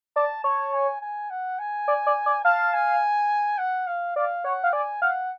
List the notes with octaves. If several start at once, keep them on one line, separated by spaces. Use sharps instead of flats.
D5 A5
C#5 A5
G#5
G#5
F#5
G#5
D5
D5
D5
F5 A5
G#5
F#5
F5
D5 F5
C#5 F#5
F5
D5 G#5
F5 F#5